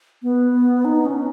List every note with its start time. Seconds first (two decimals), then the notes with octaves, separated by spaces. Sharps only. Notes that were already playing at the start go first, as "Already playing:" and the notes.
0.23 B3
0.85 D#4
1.05 C#4